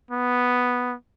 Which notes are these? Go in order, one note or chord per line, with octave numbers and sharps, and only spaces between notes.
B3